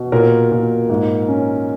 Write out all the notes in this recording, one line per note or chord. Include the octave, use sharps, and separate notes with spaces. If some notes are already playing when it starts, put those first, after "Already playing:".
Already playing: B2
A#2 A#4
A#2
G#2
C#4